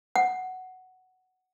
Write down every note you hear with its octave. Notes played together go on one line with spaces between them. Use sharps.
F#5